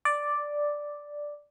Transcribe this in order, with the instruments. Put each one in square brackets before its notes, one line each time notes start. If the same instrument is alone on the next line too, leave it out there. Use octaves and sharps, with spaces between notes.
[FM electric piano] D5